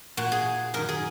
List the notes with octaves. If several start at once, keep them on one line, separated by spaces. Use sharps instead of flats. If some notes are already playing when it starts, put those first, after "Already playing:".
A#2 F#4
G#4
F#2 D#3 A#4
G#4